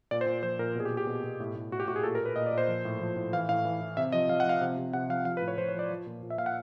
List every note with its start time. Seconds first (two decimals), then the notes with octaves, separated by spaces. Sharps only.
0.11 A#2 D5
0.21 C5
0.26 A#2
0.43 F3 C5
0.59 A#2 A#4
0.75 B2 G#4
0.85 G4
0.91 B2
0.97 G4
1.07 B2
1.24 B2
1.40 A2
1.56 A2
1.72 A2 F#4
1.80 G4
1.87 A2 F#4
1.96 G#4
2.03 A#2 A4
2.15 A#4
2.21 A#2 B4
2.36 A#2 D#5
2.46 D5
2.53 A#2 C5
2.68 F3
2.85 A2
3.01 F3
3.16 A2
3.33 E3 F5
3.49 A2 F5
3.65 E3
3.81 E3
3.97 C3 E5
4.12 F3 D#5
4.29 F3 F5
4.40 F#5
4.46 F3 F5
4.61 C3
4.78 C3
4.93 C3 F#5
5.09 F3 F5
5.25 F3 F5
5.37 B4
5.41 A2
5.48 C#5
5.58 F3 C5
5.69 C#5
5.75 F3 D5
5.90 F3
6.07 A#2
6.23 A#2
6.30 E5
6.38 A#2 F5
6.46 F#5